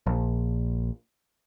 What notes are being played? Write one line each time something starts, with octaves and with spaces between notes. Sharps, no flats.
A#1